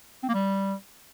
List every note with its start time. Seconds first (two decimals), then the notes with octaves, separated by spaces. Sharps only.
0.23 C4
0.29 A#3
0.34 G3